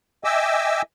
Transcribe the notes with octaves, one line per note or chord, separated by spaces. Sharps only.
D#5 E5 G5 G#5 D6 E6